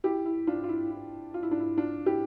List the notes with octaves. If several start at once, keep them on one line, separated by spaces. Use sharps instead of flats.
E4 G4
E4
D4 F4
F4
E4
E4
F4
E4
D4
E4
D4 F4
E4 G4